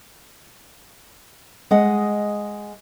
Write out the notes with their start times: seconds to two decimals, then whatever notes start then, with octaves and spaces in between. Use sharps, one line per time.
1.71 G#3 D#5 F#5